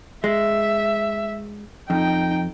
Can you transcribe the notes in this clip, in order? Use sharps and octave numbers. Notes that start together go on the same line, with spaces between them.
G#3 E5
F2 D#4 G5